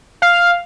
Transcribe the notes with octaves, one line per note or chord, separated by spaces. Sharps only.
F5